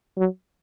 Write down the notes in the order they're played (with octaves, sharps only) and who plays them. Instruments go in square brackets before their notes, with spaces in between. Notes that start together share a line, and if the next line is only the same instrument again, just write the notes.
[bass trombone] F#3